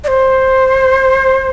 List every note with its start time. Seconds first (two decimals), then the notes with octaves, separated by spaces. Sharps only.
0.04 D5
0.08 C5